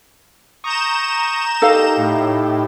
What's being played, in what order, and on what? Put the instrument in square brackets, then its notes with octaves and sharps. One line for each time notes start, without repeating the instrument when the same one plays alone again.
[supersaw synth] A#5 G6 E7 [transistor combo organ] C#6 D#6
[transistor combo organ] D#4 G4 [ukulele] A4 F5
[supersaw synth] A2